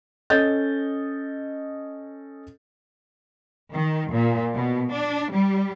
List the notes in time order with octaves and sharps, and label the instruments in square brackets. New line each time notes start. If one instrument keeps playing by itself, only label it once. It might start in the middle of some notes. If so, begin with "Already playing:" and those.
[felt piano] C#4 A4 D#5 G6 A6
[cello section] D#3
A#2
B2
D4
G3